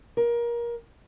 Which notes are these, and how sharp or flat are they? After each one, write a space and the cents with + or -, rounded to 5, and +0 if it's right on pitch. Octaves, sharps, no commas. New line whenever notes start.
A#4 +25